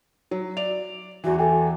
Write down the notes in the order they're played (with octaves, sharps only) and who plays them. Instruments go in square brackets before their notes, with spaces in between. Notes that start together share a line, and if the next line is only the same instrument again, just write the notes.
[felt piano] F#3
[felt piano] D5 [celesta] F7
[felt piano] E2 E3 [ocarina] F#4
[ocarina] A4 [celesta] G5 G#5